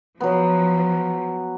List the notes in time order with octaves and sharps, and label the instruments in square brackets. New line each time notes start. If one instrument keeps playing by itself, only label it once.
[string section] F3 [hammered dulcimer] F#3 B3